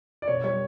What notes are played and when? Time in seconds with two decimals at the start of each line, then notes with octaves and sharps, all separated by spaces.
0.22 D5
0.28 B2 C#5
0.44 G3 C#5